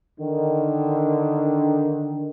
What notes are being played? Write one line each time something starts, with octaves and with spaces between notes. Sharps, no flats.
D3 D#3